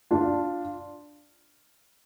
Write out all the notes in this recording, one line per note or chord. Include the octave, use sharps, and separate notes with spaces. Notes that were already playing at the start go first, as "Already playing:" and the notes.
D4 F4